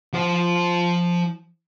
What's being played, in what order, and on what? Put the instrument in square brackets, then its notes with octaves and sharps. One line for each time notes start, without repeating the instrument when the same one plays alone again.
[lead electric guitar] F3 C5